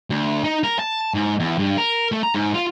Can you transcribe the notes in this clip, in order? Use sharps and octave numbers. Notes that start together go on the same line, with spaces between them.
D2
D#4
A#4
A5
G#2
E2
G2
A#4
A3
A#5
G#2
F4